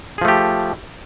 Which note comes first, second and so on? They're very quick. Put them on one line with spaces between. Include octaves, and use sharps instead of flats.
G#4 F3 A3 G4